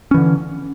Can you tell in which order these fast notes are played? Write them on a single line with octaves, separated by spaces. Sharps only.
C#4 E3 D3